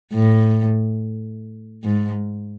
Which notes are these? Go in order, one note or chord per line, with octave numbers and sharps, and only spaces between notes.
A2
G#2